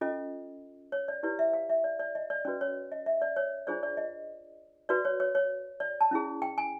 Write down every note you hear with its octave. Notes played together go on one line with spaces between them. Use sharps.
C#4 F4 A4 D#5
C#5
D5
E4 G4 B4 D5
E5
F5
E5
D5
D5
D#5
D5
C#4 F#4 B4 D5
C#5
D#5
E5
D5
C#5
D4 F4 G#4 C5 D5
D5
D#5
F#4 B4 D5
C#5
C#5
C#5
D5
A5
C#4 E4 G#4
G5
G#5